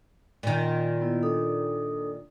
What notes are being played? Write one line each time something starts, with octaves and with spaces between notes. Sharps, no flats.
A#2 D#3
B3 E4
D4 A4 D#6